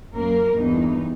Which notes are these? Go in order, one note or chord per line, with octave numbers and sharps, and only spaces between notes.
F#2 A#3 A#4
E2 G2 D#4